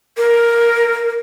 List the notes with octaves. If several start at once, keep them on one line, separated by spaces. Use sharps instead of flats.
A#4